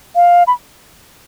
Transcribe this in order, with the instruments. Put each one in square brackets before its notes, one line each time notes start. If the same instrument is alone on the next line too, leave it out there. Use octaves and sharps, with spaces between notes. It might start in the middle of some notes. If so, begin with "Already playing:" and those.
[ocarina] F5
B5